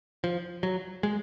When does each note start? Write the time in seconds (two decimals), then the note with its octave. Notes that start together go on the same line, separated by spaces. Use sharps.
0.24 F3
0.63 F#3
1.03 G#3